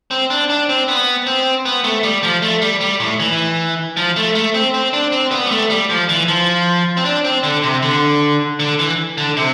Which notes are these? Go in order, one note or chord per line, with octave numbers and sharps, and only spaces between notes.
C4
D4
D4
C4
B3
C4
B3
A3
G3
F3
A3
G3
G3
A2
E3
F3
A3
A3
C4
C4
D4
C4
B3
G3
A3
G3
F3
E3
F3
C4
D4
C4
D3
C3
D3
D3
E3
D3
C3